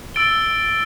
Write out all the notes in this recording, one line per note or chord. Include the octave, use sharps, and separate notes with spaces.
E6 A6 D7 G7